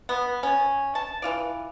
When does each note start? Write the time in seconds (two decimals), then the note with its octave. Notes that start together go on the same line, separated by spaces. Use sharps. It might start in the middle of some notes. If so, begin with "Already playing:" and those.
0.09 B3
0.43 C#4
0.95 A5
1.22 E3 F4 D5